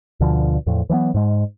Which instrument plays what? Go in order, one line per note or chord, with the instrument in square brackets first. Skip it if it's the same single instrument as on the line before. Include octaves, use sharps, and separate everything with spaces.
[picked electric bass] D2 B2 D3 F3
E2 A2 F3
E3 F#3 A3 B3
G#2 G#3